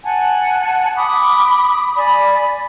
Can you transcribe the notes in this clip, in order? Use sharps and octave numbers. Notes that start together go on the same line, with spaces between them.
F#5 G#5 A5
B5 D6 D#6
D5 G#5 B5